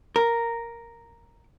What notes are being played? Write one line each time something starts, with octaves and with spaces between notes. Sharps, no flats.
A#4